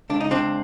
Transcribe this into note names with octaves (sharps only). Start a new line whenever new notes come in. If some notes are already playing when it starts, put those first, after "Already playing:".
C#2 D4
D#4
C#2 C4 D4